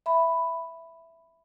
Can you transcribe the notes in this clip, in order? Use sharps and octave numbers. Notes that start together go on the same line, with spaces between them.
E5 B5